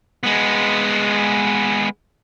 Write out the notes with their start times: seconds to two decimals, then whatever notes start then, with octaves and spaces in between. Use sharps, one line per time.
0.23 G#3 B3